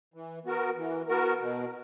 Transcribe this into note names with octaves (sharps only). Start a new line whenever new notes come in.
E3
B3 F#4 A#4
E3
B3 F#4 A#4
B2